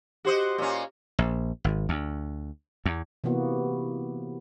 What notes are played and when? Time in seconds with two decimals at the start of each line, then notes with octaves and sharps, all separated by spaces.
0.25 F#4 G4 C5 D#5
0.58 A#2 C#4
1.19 A#1
1.64 G#1
1.89 D2
2.86 E2
3.24 C3 E3 A#3 B3 F#4